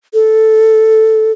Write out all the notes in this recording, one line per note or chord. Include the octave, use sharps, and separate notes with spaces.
A4